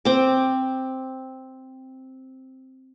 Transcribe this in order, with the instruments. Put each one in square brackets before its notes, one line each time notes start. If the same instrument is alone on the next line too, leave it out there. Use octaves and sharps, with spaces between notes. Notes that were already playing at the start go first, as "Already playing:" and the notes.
[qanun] C4 D6